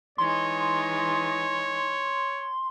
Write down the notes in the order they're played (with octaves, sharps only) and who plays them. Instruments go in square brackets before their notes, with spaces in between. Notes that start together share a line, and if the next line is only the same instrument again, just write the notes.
[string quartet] E3 G#3 D#4 [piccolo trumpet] C#5 [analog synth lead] C6